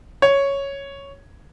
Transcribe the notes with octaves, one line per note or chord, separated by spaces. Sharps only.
C#5